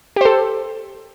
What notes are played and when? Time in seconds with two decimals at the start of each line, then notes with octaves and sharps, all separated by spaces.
0.16 G4
0.21 C5
0.25 A4